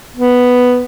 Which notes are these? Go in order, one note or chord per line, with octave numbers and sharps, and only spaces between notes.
B3